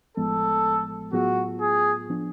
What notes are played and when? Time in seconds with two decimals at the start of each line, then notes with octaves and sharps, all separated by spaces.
0.17 A1 A2 F3 G#3 B3 A4
1.13 A2 F#3 B3 F4 F#4 G#4
1.61 G#4
2.09 F3 B3 D4